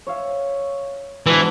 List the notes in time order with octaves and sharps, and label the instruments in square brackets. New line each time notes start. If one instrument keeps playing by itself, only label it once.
[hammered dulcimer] C#5 E5 F5
[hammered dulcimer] G#2 B2 D4 [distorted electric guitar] E3